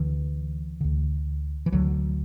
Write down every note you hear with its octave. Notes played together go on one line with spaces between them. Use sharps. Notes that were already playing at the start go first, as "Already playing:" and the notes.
Already playing: D2 D3 E3
D2 D3
E3
D2 D3 F#3